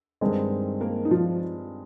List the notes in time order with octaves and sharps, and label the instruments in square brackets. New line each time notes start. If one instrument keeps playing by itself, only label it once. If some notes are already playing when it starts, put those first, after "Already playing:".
[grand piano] G2 D#3 G#3 C4
[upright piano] A#3 A#4
D#4
F3 F4